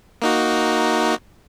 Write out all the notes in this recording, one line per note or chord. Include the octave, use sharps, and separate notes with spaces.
A#3 D#4 F#4